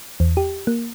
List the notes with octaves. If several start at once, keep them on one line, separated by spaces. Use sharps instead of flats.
E2
G4
A#3